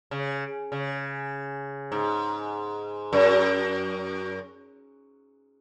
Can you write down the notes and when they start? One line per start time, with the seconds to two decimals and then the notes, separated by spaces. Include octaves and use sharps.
0.11 C#3
0.72 C#3
1.92 G#2
3.13 F#2